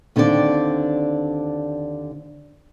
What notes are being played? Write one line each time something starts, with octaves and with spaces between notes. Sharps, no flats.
D#2 D3 C4 D4 D5